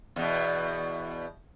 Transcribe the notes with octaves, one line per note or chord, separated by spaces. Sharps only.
E2 B2